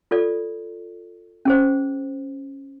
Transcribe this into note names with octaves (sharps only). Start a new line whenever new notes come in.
F4 A4 D5
C#4 G#4 C5